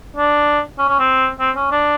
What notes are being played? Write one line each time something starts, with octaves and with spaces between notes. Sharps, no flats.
D4
C#4
C#4
C4
C4
C#4
D4